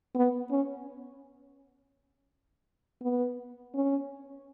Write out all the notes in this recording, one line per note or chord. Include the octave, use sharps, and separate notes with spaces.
B3
C#4
B3
C#4